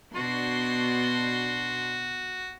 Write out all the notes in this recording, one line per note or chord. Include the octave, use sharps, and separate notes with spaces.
B2 D4 F#4 C6